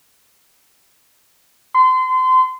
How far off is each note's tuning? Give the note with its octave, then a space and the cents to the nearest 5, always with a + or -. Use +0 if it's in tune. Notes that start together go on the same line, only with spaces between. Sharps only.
C6 -30